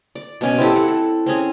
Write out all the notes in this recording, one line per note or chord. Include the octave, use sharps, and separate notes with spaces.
D5
B2 C#4 G#5
C4 E4 G4 A4
F#5
A4
C4 C#4 G#4